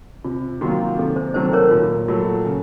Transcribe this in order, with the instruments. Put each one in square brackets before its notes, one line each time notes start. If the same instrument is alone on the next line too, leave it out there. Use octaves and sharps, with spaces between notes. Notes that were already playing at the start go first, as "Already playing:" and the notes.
[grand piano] C3 [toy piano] F4
[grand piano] D#3 F#3 A#3 F4 [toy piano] F#4
[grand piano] C3 [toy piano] A4
[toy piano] C5
[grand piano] D#3 F#3 A3 C4 [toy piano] C5
[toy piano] A#4 C#5
[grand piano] A#2 [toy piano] F4
[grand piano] F#3 A3 [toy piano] F4
[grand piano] C#3